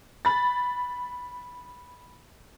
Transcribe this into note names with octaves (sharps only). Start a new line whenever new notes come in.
B5 A6